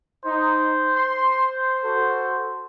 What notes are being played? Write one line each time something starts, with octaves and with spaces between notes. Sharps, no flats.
D#4 C5
C6
F#4 A4